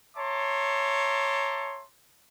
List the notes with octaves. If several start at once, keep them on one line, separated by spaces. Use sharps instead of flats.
C#5 E5 A5 A#5 C6 D6